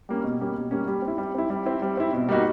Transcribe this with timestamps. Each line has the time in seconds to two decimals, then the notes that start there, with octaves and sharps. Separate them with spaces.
0.09 G3 A#3 C#4
0.24 B2
0.40 G3 A#3 C#4
0.56 B2
0.71 G3 A#3 C#4
0.87 G3
1.02 C4
1.08 E4
1.18 G3
1.34 C4 E4
1.50 G3
1.66 C4 E4
1.82 G3
1.97 C4 E4
2.13 B2
2.29 G3 A#3 D#4 F#4